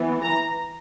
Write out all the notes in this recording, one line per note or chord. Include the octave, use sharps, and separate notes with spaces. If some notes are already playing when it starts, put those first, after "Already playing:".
Already playing: E3 B3
A#5